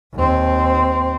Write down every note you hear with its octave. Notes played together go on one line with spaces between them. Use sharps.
D#2 C4